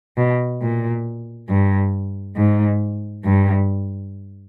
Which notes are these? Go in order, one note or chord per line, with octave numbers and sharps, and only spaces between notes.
B2
A#2
G2
G#2
G2